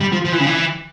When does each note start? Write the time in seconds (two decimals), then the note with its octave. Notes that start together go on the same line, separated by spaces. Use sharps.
0.01 G3
0.12 F3
0.25 F3
0.32 E3
0.40 C#3
0.46 E3